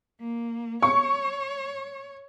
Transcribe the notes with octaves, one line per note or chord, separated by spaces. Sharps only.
A#3
C#5 C#6